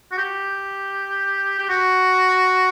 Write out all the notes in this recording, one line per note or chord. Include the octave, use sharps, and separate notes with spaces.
F#4
G4
G4
F#4